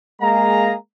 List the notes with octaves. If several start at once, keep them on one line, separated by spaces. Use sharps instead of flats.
G#3 A#3 G#4 F5 A#5